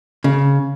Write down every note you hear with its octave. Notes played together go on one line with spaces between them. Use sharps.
C#3